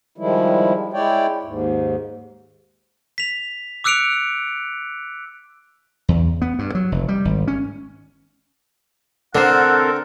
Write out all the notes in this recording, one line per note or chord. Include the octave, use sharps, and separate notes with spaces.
D#3 F3 G3 G#3 E4
G#3 E4 C#5 D5 G5
D#2 G#2
B6 F7
D6 E6 F#6 C#7 D7 F7
E2
B3
G2
F#3
F1
G3
G#1
C#4
D3 C4 D4 A4 A#4 C5 F#5